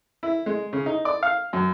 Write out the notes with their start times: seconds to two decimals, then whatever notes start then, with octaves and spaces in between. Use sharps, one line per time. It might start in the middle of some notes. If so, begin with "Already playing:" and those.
0.23 E4
0.46 G#3
0.73 C#3
0.86 D#4
1.05 D5
1.23 F5
1.53 F#2